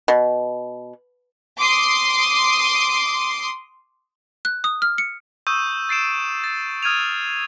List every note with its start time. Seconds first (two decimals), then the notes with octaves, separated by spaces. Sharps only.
0.08 B2
1.58 C6 D6 D#6 C7
4.45 F#6
4.64 D#6
4.82 F6
4.98 C#7
5.47 C#6 D#6 E6 G6 D#7
5.89 A6 C7 D7 E7
6.44 A6
6.83 D#6 F6 G#6 D#7 F7